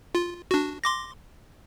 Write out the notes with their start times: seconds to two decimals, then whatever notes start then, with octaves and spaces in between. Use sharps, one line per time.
0.15 F4
0.51 D4 F#4
0.84 C6 D6 A#6